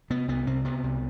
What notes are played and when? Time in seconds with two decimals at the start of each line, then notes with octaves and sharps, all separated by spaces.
0.10 C3 B3
0.28 C2 B3
0.47 C3 C4
0.64 C3 B3
0.83 C2